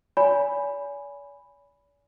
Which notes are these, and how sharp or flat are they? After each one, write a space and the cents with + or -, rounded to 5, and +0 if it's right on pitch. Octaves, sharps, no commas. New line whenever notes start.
D5 -45 G#5 +0 B5 +0